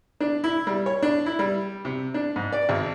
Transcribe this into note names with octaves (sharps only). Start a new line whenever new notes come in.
D4
E4
G3
C#5
D4
E4
G3
C3
D4
G#2
D5
G#1